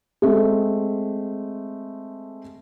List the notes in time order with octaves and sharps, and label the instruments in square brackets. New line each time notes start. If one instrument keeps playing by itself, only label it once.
[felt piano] G#3 A3 C4